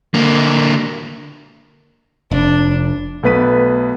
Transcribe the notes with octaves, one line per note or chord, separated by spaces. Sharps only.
D3 A#3
F1 D4
B1 A3 B3 B4 B6 D#7